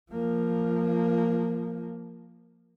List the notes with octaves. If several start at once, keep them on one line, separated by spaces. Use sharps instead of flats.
F3 A#3